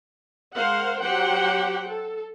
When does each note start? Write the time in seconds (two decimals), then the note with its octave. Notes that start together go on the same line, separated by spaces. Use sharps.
0.56 G#3 A#4 C5 F5 F#5
1.02 F#3 G4 C5 F#5 G5
1.87 A4